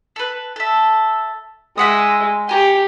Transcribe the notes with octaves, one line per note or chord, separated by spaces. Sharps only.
A4 B4
A4 E5
G#3 E5 F#5 D#6
G4 G#5 A#5 C#6